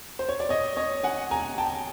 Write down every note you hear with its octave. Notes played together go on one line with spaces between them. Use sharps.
C5
C#5
D5
C#5 D#5
C#5 D#5
F#5 G#5
G#5 A#5
G5 A5